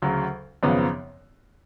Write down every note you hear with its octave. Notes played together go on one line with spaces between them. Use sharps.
D2 C#3 F#3
G#1 F#2 C#3 F3 B3